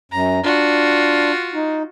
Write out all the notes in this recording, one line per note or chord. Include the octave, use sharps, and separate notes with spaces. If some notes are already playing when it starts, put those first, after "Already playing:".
F#2 A#5
D4 F4 F#4
D#4